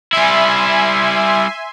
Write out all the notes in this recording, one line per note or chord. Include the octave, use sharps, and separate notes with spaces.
G3 E4 E5 G#5 C6